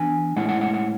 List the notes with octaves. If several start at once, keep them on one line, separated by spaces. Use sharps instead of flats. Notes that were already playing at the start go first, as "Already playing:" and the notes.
Already playing: E3 B3 D4 G#5
A2 G#3 C#4 E4 F#5
F#5
F#5
F#5